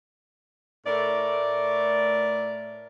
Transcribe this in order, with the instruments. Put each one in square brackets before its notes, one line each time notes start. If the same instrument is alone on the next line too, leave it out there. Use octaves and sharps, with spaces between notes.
[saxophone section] A2 A3 A#4 D5